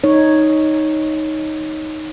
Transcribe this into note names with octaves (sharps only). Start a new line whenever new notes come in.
D#4 C#5